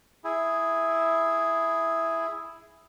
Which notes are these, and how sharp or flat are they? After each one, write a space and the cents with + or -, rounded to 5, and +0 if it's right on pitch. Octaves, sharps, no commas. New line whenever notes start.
E4 +0 G#4 +0